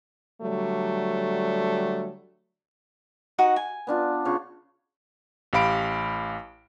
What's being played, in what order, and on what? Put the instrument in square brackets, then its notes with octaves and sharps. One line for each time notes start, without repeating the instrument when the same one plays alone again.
[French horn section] D3 F#3 G3 A3
[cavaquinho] D#4 F#4 F#5
G#5
[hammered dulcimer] B3 D4 F4
C#3 F4 C#6
[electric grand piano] A1 G4 F5 B5 D7